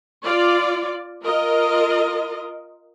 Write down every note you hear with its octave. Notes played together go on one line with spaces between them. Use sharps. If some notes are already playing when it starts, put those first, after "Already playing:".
F4 D5
F4 A#4 D#5